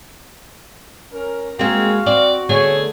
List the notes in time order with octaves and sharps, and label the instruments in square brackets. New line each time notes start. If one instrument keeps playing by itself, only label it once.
[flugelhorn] C#4 [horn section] A#4
[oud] G#3 A#3 [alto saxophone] C4 [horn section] F#4 [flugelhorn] F5
[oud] C4 [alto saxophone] D5
[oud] D3 A3 B3 [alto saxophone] G#4 [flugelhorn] C#5